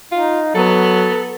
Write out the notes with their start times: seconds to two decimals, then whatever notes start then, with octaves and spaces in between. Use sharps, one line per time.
0.12 D#4 F4
0.55 F#3 B3 A4